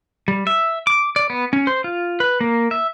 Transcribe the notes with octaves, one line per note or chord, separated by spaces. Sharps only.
G3
E5
D6
D5
B3
C#4
C5
F4
B4
A#3
E5